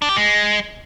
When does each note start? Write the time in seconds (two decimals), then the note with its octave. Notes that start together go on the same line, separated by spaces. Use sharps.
0.02 D4
0.09 G4
0.16 G#3